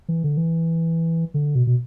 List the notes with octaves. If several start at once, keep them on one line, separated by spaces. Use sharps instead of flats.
E3
D3
E3
D3
B2
B2